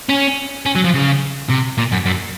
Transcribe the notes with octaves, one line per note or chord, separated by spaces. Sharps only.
C#4
C#4
F#3
F3
C#3
C3
A#2
F#2
F#2